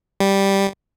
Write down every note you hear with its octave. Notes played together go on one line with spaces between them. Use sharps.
G3